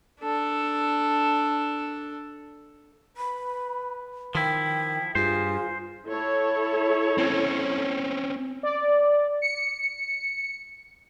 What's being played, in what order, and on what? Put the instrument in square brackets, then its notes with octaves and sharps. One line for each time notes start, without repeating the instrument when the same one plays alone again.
[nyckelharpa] D4 A4
[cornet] B4 [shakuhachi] B5
[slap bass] D#3 [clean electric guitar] F3 E4 [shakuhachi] G5
[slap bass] G2 [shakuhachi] F4 [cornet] G#4 [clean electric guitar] C5
[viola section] E4 A4 C#5
[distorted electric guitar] C4 C#4
[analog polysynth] D5
C#7